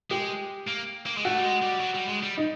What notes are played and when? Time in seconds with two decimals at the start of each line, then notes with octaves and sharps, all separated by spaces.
0.11 G#3 G4
0.67 A#3
1.06 A#3
1.17 G#3
1.24 A3 F#4
1.36 G3
1.44 G#3
1.63 G3
1.80 F#3
1.95 G3
2.09 G#3
2.23 G3
2.38 D#4